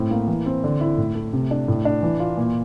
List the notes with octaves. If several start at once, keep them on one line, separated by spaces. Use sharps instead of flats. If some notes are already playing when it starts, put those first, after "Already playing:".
Already playing: A2 C4
A#3
E3
C4
D3
E4
A2
A3
C3
D4
A2
D4
E3
F4
A#2